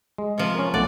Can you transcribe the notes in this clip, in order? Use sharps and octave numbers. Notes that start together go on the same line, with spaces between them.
G#3
C3 F3
C#4 A#4
B1 A3 D5 F#5